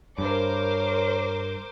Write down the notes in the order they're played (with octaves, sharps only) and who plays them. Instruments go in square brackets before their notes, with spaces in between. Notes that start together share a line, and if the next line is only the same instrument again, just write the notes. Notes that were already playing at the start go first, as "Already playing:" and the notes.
[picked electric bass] G2 [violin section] A#4 C5 D6 [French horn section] C#5